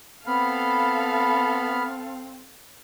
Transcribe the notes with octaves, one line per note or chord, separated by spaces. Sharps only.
B3 C4 A4 F5 B5 F6